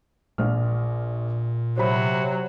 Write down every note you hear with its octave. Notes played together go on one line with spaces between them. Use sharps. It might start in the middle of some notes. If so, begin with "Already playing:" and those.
A#1 A#2 F6
C3 F#3 C5 B5